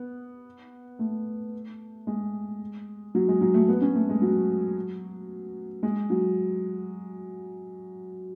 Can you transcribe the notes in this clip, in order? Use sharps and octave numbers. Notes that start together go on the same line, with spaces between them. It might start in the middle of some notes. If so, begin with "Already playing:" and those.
Already playing: B3
A3
G#3
F#3
G#3
F#3
A3
B3
C#4
A3
G#3
F#3
G#3
F#3